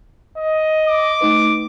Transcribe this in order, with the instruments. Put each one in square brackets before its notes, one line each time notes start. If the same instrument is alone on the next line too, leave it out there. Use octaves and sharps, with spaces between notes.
[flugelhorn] D#5
[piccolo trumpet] D6
[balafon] A3 D#4 B4